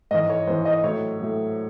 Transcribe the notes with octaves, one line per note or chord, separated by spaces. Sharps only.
G#2 E3 D#5
C#5
G#2 E3 C5
D#5
A2 F#3 C#5
A2 F#3